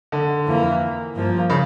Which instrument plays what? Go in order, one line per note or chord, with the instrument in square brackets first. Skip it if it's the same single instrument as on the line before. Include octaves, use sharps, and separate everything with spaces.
[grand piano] D3
[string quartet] F2 E3 A#3
G2 F3 A#3
[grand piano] C#3